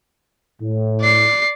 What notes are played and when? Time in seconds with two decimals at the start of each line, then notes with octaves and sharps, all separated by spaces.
0.62 A2
1.01 D5 C7